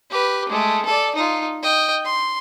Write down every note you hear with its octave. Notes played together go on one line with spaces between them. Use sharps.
G4 B4
G#3 A3
A4 D5
D#4 F4
D#5 G5
C6